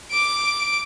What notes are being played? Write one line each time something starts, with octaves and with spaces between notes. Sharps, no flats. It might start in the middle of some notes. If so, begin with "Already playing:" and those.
D6 D7